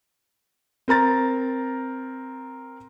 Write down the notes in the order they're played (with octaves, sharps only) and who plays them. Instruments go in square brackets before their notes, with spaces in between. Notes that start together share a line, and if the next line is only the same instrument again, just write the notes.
[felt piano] C4 A#4 A#5 A6